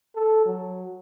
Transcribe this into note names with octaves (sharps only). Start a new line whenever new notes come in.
A4
F#3